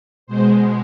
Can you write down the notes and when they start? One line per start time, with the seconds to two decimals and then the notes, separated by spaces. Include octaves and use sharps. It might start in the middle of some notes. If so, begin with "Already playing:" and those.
0.27 B2 G#3 C5